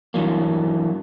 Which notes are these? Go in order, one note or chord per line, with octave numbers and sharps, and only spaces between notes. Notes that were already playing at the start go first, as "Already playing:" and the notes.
G2 E3 F#3 A#3